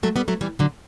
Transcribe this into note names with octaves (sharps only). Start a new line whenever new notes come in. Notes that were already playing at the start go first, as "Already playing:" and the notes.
F#3 A3
G3 B3
F#3 A3
E3 G3
D3 F#3